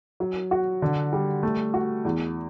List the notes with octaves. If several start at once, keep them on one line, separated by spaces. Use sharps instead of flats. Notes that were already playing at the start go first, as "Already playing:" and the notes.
F#3
F#4
D3
G3
A3
F#4
E2